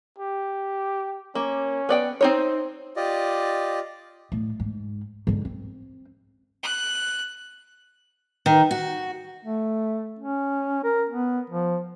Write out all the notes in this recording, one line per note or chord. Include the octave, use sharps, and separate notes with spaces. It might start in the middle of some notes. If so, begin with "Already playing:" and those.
G4
A#3 C#4
B3 D5 G5
C4 D#4 C5 C#5
F4 G4 D5 D#5
A2
G#2
G#2 D3
C4
F#6
D#3
F#4
A3
C#4
A#4
B3
F3